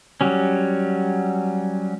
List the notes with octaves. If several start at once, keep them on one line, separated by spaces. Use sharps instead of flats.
F#3 G3 C#4